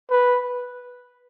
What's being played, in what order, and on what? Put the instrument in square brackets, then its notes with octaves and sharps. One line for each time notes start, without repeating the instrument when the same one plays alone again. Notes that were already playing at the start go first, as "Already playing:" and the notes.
[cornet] B4